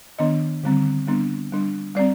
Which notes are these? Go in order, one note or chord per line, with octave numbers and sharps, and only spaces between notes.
D#3 B3 D4 D#5
D3 G3 C4
G3 B3 D4
G3 D4
G3 C4 D5